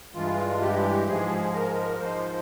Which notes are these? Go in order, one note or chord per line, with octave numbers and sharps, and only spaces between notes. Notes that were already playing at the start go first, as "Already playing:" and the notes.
G2 E3 G#3 F4
G4
G#2 F3 G#3 G#4
A#4
G#2 F3 G#3 C5